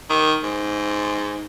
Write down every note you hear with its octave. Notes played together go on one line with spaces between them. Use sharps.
D#3
G#2